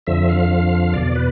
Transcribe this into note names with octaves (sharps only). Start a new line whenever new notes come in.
F2 D3 F3 E5
F5
E2 B2 D5
B4